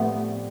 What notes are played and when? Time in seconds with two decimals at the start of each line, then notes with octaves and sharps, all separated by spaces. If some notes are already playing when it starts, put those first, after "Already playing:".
Already playing: A2 F3 A3 B3 C4 G4 D5